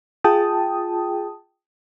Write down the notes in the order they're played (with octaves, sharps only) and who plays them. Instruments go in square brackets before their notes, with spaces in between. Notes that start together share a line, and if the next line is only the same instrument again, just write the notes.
[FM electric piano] F4 G#4 G5 A5 D#6